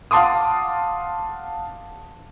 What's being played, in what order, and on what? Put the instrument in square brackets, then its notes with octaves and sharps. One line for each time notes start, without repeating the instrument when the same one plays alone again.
[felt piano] F5 F#5 A5 C6 D6 D#6